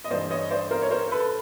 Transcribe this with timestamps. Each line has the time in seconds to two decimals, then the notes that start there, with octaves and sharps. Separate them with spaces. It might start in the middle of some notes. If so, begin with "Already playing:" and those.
0.04 D#5
0.10 G2 E3 C5 D5
0.30 C#5 D#5
0.51 C5 D5
0.71 A#4 C5
0.82 C#5
0.91 A#4 C5
1.11 A4 B4